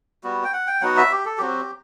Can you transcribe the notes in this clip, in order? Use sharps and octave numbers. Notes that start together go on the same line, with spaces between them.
G3 B3 F#4
G5
F#5
G5
F#3 B3 D#4 F#4 F#5
E5
G4
A4
F#3 C4 F#4 G4